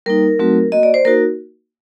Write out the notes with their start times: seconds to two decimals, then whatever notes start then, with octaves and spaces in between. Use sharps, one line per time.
0.06 G3 A#3 D#4 A#4
0.39 F#3 A3 C4 D#4 F#4
0.72 A#3 F#4 D#5
0.83 D5
0.94 C5
1.05 A#3 D#4 F#4 A#4